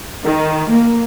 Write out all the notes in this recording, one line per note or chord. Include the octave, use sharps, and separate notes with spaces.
D#3
A#3